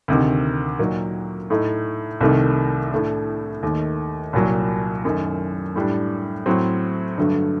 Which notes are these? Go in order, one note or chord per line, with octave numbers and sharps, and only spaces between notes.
D2 C3 D#3
A#2 F#3 A#3 D#4
A2 A3 D#4
C2 C3 D#3 A3
A2 A3 D4
D#2 D#3 A3
C2 A#2 F#3
F#2 D#3 A3
A2 G3 D4
A2 F#3 C4
G2 D3 F#3 A3